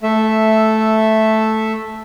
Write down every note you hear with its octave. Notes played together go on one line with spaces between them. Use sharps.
A3 E5